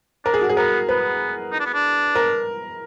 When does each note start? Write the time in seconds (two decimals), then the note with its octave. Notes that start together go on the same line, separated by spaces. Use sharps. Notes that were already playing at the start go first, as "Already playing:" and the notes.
0.25 D4 A#4
0.34 G#4
0.41 F#4
0.49 G#4
0.57 B3 A#4
0.89 B3 B4
1.52 D#4
1.60 D4
1.66 B3
1.74 D4
2.15 A#4